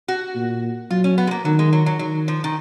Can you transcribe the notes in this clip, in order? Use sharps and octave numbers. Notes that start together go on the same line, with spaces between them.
F#4
A#2
F#3 F4
C#4
B3
G#3
A#3
D#3 F#3
G#3
F#3
F#3
D#3 F#3
F3
D#3